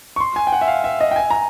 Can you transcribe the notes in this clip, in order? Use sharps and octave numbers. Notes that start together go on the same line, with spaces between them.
C#6
C6
G#5
G5
F#5
E5
F5
E5
D#5
G5
G#5
A#5